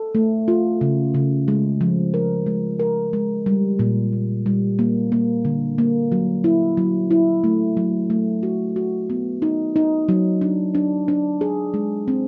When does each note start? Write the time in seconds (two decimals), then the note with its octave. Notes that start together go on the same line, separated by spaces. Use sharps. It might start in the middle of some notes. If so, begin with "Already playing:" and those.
Already playing: A4
0.15 A3
0.48 F4
0.81 C#3
1.14 C#3
1.48 G#3
1.81 F3
2.14 A#4
2.46 G#3
2.79 A#4
3.13 G#3
3.46 G3
3.79 A#2
4.12 A#3
4.46 G3
4.79 A#3
5.12 A#3
5.45 D3
5.78 A#3
6.12 F#3
6.44 E4
6.77 F#3
7.11 E4
7.44 A3
7.77 F#3
8.10 A3
8.43 F#4
8.76 F#4
9.10 B3
9.42 D#4
9.76 D#4
10.09 F#3
10.41 D4
10.75 D4
11.08 D4
11.41 G#4
11.74 G#3
12.08 C4